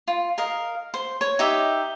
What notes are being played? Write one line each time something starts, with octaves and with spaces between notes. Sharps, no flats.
F4
A#4 D#5 F5
C5
C#5
D#4 G4 E5